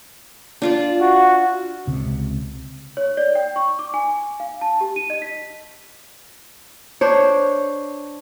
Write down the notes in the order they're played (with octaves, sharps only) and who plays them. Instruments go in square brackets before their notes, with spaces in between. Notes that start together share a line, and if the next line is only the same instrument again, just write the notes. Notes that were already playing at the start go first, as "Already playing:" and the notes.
[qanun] D4 F4 D5
[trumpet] F#4
[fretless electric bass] C#2 C3
[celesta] C#5
D5
G5
C#6
D6
G#5
F5
A5
G4
D#7
D#5
B6
[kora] D4 C5 C#5